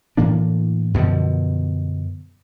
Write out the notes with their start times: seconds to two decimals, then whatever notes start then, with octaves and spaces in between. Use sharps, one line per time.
0.17 A2 E3 A#3 D4
0.94 F#2 B2 D3 F3